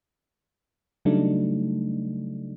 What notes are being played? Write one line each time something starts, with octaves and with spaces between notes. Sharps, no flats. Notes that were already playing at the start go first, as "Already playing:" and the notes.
C#3 F#3 G3 A3 D4 D#4